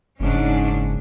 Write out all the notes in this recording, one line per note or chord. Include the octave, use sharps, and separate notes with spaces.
F#1 G#2 C#4 D4